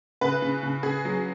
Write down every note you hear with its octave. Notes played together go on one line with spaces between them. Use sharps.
C#3 B4
C#3
C#3
C#3 G#4
F#3